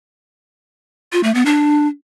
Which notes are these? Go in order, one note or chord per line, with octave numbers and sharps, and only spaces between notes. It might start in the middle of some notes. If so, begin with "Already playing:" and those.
F4
A3
B3
D4